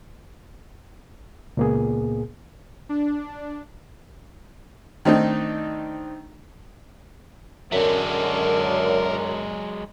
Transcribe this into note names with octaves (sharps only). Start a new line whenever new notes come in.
C#2 A#2 A#3 B3 G#4
D4
D#3 A3 C4 D4 D#4
F#2 D3 F#3 G#3 A#4 E5